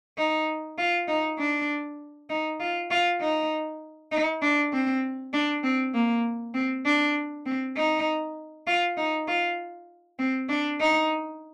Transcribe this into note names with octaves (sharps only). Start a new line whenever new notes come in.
D#4
F4
D#4
D4
D#4
F4
F4
D#4
D#4
D4
C4
D4
C4
A#3
C4
D4
C4
D#4
F4
D#4
F4
C4
D4
D#4